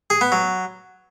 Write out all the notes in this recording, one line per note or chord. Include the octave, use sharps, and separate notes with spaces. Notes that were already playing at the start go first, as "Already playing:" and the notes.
G#4
B3
F#3